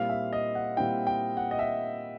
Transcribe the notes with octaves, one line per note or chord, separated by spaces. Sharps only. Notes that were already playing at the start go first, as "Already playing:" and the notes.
Already playing: A#2 G3 C4 E4 F5
E5
D#5
F#5
A#2 G3 C4 E4 G5
G5
F#5
D#5
E5